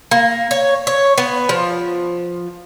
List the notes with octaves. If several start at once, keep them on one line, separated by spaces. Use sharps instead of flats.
A#3
C#5
C#5
B3
F3